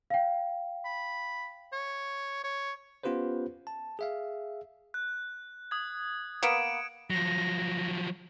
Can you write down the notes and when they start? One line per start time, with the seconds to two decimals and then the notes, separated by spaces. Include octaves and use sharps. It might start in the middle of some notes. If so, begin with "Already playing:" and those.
0.10 F5 G5
0.85 B5
1.73 C#5
2.44 C#5
3.03 B3 C#4 F4 G4 B4 C5
3.67 A5
3.99 G#4 E5 F5
4.94 F#6
5.71 D#6 G#6
6.43 A#3 B3 C#7 D7 E7
7.10 F3 F#3 A#6